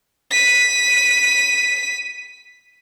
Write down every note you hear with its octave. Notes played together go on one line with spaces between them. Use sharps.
B6 D#7